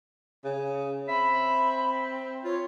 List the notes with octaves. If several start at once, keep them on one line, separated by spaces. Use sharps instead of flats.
C#3
C4 E5 B5
F4 C#5